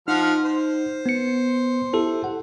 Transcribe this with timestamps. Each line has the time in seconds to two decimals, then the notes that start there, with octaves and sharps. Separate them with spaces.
0.08 F3 D#4 F#5 F6
0.45 C5
1.06 B3 C#7
1.93 E4 G4 A4
2.24 F#5